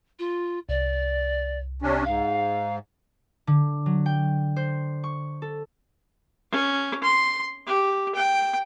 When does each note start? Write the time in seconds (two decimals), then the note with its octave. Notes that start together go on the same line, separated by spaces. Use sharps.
0.19 F4
0.69 C2 D5
1.82 C3 C#4 D4
2.05 G#2 F5
3.47 D3
3.86 F#3
4.06 G5
4.56 C5
5.04 C#6
5.42 A4
6.51 C#4
7.03 C6
7.67 G4
8.15 G5